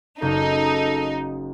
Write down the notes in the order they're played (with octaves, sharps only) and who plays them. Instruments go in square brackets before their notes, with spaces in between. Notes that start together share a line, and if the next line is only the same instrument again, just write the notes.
[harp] F#1 G6 [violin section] D#4 [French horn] A4